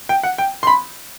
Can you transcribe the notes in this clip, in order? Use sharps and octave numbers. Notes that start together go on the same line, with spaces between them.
G5
F#5
G5
C6
B5